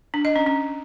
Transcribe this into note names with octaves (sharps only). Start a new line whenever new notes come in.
D4
D#5
C#4
C#4